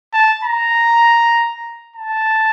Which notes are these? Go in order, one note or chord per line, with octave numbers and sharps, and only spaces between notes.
A5
A#5
A5